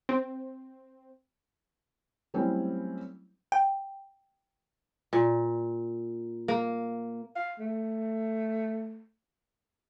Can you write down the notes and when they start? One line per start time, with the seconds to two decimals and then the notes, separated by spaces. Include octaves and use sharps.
0.09 C4
2.34 F#3 G3 A3 C4 C#4 E4
3.52 G5
5.13 A#2
6.48 A#3
7.36 F5
7.59 A3